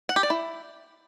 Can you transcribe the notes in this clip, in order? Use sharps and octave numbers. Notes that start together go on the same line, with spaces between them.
F#5
G4
D5
E4